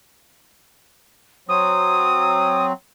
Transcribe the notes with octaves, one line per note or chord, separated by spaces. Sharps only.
F#3 C4 D#6